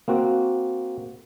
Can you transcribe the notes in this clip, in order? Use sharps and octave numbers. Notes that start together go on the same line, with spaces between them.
A#3 C4 F#4